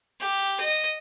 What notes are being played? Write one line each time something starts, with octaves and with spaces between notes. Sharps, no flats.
G4
D#5